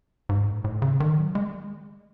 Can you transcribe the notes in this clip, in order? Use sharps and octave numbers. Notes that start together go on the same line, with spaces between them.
G#2
A2
A2
C#3
D#3
F#3
G#3